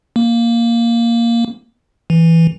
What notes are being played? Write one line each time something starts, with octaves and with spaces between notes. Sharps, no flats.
A#3
E3